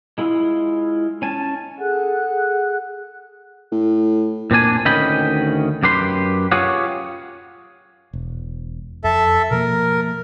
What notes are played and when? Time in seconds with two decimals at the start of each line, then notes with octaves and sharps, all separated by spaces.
0.18 G#3 E4 F4
1.22 C#4 G#5 A5
1.78 G#4 A4 F#5 F#6
3.72 A2
4.51 A#2 C4 D4 G#5
4.85 D2 D#3 C#4 D#5 G5 B5
5.83 F#2 G4 B4 C6
6.52 F4 G4 G#4 C#5 F#5
8.13 E1
9.04 F2 A4 E5
9.51 B2 F3 A#3 A#4